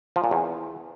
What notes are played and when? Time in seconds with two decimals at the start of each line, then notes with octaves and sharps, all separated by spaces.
0.16 F3
0.24 A#2
0.31 E2